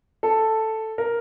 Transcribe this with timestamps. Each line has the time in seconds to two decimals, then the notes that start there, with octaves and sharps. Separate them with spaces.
0.23 A4
0.98 A#4